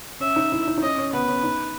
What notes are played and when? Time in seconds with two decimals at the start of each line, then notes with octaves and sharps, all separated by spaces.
0.20 C#4 E5
0.36 D#4
0.52 E4
0.67 D#4
0.78 D#4
0.82 C#4 D#5
0.98 C#4
1.13 B3 B4
1.28 C#4
1.44 D#4